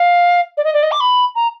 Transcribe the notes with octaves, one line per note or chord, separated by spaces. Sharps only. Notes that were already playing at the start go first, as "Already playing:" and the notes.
Already playing: F5
D5
D#5
D5
D#5
D6
B5
A#5